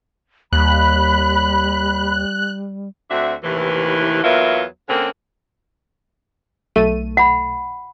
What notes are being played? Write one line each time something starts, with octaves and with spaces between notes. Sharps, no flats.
D#2 G3 B5 F#6
D2 C4 D4 F#4 E5
D#2 A2 C3 E3
E2 F#3 A#3 B3 F4 E5
D3 A#3 C4 C#4
B1 A3 D#7
F#5 B5